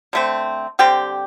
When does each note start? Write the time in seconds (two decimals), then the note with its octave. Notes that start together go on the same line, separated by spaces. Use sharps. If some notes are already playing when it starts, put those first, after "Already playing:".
0.13 D3 A3 C4
0.79 D3 G3 C4 G4 G5